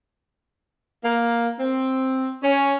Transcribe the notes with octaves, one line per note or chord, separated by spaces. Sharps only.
A#3
C4
C#4